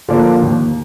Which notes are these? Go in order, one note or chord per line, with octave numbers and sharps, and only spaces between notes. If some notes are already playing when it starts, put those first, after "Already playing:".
D3 F3 A#3 D4
D#2